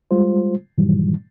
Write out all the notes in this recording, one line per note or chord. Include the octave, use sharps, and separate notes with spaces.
G3 G#3 F4 C5
G2 A#2 D#3 E3 F#3 G3